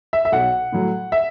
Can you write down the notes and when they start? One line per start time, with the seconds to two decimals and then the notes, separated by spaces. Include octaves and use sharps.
0.13 E5
0.25 E5
0.32 B1 F#5
0.72 A2 F#3
1.12 E5